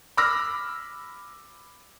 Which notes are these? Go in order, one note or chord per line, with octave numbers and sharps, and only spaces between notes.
B5 D6 E6 F6 A#6